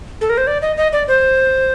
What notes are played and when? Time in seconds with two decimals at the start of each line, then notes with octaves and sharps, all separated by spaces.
0.21 A4
0.30 A#4
0.38 C5
0.47 D5
0.62 D#5
0.77 D#5
0.93 D5
1.08 C5